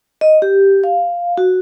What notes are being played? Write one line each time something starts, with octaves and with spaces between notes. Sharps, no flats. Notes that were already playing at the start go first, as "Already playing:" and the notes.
D#5
G4
F5
F#4